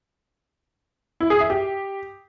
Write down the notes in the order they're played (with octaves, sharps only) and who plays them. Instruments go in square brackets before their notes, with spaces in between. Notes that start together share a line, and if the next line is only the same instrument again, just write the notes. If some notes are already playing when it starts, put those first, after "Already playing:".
[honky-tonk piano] E4
G#4
E5
G4